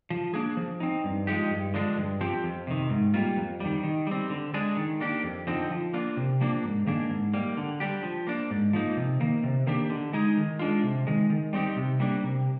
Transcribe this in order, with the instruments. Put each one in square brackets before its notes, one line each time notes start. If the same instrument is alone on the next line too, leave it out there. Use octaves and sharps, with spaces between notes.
[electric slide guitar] F3
A#3 D4 G#4
F3
C4 D#4
G2
F3 G#3 D#4 G4
G2
D3 F3 G#3 D4
G2
F3 C4 G4
F2
C3 D#3
G#2
G3 A#3 F4
F2
D#3 G3
D#3
G3 C4
D3
G#3 D4 G#4
D#3
A#3 D4 G4
F2
D3 F3 C4 D#4
F3
A#3 D4 F4
C3
F3 A#3 D4
G#2
D#3 A#3 D4 G#4
G#2
G3 A#3
D3
G3 D4 G4
F3
A#3 D4
G#2
F3 A#3 D#4
C3
D#3 A#3
C3
D#3 A#3 D4 G4
D3
G#3 D#4 G#4
D#3
G#3 D4 F4
C3
D#3 G#3
D#3
G3 C4 D#4 G4
C3
G3 A#3 D4
C3